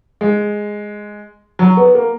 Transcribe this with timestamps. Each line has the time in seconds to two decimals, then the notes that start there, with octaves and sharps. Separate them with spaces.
0.21 G#3
1.59 F#3
1.77 B3
1.95 A#3